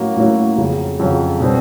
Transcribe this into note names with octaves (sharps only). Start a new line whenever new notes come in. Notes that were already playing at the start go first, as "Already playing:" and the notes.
Already playing: A2 F#3 A#3 C#4 F#4
A2 F#3 A#3 C#4 F#4
F2 C#3 F#3
F2 C#3 F#3
B2 G3 C4